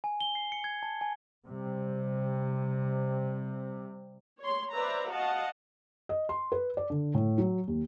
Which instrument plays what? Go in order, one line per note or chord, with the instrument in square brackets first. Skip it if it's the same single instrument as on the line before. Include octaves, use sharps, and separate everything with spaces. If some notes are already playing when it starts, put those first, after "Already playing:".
[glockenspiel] G#5
G7
C7
C#7
G#6
A5
G#5
[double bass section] C3 G3
[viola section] C#5 C6
B4 C5 D5 E5 A#5
F#4 D#5 F5 F#5 A5
[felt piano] D#5
C6
B4
D5
D3
A2
F#3
D#2